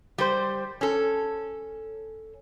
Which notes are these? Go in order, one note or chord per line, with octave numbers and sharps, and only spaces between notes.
G3 C5
C#4 A4